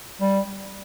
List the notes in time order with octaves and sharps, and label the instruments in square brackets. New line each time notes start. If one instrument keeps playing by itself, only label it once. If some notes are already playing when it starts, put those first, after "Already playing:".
[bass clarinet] G3